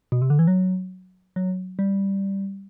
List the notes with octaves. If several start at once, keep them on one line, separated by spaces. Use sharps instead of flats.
B2
C3
D3
E3
F#3
F#3
G3